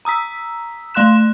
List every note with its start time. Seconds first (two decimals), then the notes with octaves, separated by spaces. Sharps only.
0.05 A#5 D#6 E6 B6
0.94 A3 F5 C6 F#6 E7